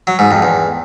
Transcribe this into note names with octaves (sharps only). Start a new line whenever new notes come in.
F#3
G#2
F2
E2